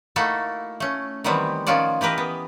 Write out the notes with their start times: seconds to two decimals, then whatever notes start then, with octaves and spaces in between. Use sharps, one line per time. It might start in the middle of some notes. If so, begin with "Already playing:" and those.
0.16 A3 A#3 D#4 E4 F#4 A4
0.80 A3 C#4
1.24 D#3 E3 F#3 G3 B3 C4
1.67 D#3 F3 C#4 F4 F#4 D5
2.01 E3 G4 A#4 B4 D#5
2.18 B3